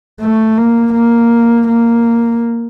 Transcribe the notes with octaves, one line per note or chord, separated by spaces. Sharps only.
A3
A#3
A#3
A#3